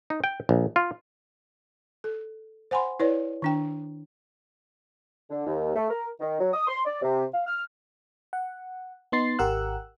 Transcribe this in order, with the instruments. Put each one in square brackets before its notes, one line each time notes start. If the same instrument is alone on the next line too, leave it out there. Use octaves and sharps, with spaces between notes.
[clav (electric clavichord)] D#4
G5
A#1
F4
[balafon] A4
C5 F#5 G#5 B5 C6
E4 B4 C#5 D5
D#3 D4 G5
[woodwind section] D3
D#2
A3
A#4
D#3
F#3
D#6
C6
D5
C3
F5
F6
[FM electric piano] F#5
B3 D#4 C6 A6 C7
G#1 G4 A#4 F#5 E6 F#6